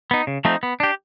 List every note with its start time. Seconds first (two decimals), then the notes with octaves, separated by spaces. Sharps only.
0.11 B3 D#4
0.27 C#3
0.45 F3 A3 C4 D#4
0.63 B3
0.80 D4 G4